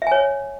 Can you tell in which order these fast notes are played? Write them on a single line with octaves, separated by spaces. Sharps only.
E5 G#5 C#5